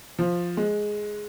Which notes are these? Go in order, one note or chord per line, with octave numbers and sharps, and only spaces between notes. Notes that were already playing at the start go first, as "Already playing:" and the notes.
F3
G#3